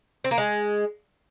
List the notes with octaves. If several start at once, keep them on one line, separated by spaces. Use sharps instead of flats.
C4
A#3
G#3